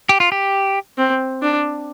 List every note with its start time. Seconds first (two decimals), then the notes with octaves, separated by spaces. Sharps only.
0.09 G4
0.20 F4
0.32 G4
0.98 C4
1.42 D4